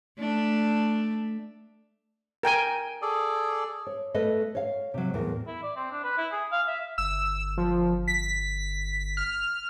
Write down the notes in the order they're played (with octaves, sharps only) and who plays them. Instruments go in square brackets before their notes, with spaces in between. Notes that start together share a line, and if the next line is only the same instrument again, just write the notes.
[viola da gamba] A3 D4
[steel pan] A#4 G5 G#5
[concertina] G#4 A4 D5
[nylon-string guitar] C#5
A3 A4 B4 D#5
C#5 F5
C3 F#3
E2 A2 A#4
[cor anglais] E4
D5
C4
D4
B4
E4
G#4
F5
E5
[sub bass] G1 [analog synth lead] E6
[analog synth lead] F3
B6
F6